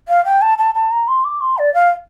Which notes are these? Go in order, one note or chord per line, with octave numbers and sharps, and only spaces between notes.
F5
G5
A5
A5
A5
A#5
C6
D6
C6
D5
F5